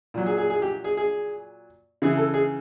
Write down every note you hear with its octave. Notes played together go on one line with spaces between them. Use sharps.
A#2 F#3
G#4
G#4
G#4
G4
G#4
G#4
C#3 E3 G#4
A4
G#4